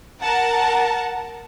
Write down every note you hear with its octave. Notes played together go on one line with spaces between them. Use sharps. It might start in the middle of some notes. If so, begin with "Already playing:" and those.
A#4 F#5 A5